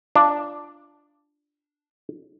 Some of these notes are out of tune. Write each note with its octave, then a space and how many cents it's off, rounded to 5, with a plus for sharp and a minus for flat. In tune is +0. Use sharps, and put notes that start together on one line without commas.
D4 +0 F4 -20